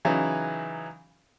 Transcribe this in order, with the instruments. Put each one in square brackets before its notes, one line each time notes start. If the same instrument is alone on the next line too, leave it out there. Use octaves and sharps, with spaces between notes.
[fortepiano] C#3 E3 F#3 D#4